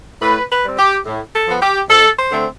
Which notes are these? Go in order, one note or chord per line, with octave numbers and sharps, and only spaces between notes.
A2 B4
B4
G3 C4
G4
A2
A4
F3 B3
G4
F2 A4
C5
D3 A3 C4